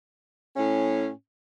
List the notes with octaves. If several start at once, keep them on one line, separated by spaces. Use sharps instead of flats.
A2 C#4